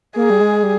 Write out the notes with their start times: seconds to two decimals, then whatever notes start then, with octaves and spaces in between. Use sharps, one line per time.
0.16 A#3 G#4
0.30 G3
0.41 G#3
0.63 G3